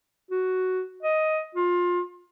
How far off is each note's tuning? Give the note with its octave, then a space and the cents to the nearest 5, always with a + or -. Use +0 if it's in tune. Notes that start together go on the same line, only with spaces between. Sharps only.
F#4 +5
D#5 +10
F4 +20